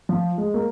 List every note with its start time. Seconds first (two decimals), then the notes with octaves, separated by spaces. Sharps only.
0.09 F3
0.38 G#3
0.54 A#3